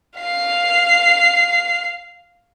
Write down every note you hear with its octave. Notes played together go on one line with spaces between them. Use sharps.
F5 C7